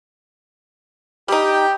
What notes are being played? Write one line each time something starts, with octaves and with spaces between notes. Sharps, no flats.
G3 D#4 G4